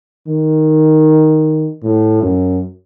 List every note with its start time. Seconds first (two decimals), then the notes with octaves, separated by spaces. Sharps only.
0.27 D#3
1.83 A2
2.22 F#2